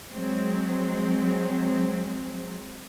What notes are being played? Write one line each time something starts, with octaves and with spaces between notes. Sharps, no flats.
F#3 G#3 C4